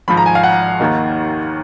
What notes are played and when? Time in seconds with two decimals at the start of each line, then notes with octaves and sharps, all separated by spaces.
0.08 G#1 G#2 F3 B5
0.17 A#5
0.26 G#5
0.35 F5
0.43 F#5
0.79 D#2 D#3 A#3 D#4